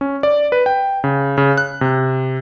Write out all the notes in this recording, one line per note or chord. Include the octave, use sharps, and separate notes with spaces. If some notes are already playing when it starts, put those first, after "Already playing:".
C#4
D5
B4
G5
C#3
C#3
F#6
C3